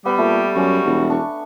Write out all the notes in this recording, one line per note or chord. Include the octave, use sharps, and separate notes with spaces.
G3 B3 G4 B5
A#2 A3
F#2 C#4 F#4 D5
E1
D4 C#6